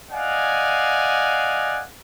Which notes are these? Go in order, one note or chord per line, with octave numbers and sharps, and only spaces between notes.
D5 D#5 F5 F#5 G#5